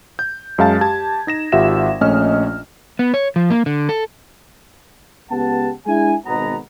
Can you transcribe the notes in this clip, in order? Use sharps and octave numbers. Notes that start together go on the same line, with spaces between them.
G6
F#2 G#3 F5 A5 A6
G4 A5 G#6
D#4 A#6 E7
G#1 F4 G4 E5 F#5 E7
A#1 A3 C#4 D#5 F6
B3
C#5
F3
A#3
D3
A4
C#2 B3 G4 F#5 A5
G#3 D4 E4 G#4 G#5
G#1 B2 B3 A#5